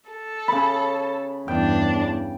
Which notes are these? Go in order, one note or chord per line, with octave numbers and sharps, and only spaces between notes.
A4
C#3 B5
E2 G2 D4 G5